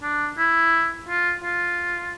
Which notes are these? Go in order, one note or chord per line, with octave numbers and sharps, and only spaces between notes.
D4
E4
F4
F4